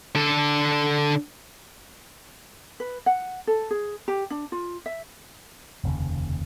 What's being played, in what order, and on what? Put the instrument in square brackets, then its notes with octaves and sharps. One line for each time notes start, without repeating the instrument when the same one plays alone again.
[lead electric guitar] D3 A4
[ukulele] B4
F#5
A4
G#4
G4
D4
F4
E5
[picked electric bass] F1 D#2 C#3